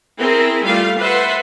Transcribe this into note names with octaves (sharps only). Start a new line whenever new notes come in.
C4 E4 G#4 A#4
G3 A3 F4 F5
B4 C5 E5 F#5 A5 C6